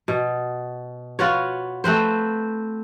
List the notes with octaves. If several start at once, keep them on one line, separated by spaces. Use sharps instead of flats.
B2
F4 F#4 B4 C#5
A3 C4 B4 C5